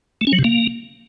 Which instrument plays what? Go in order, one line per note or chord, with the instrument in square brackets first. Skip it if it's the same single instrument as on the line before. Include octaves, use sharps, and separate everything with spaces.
[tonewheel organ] A3
C#4
F#3
C3
A#3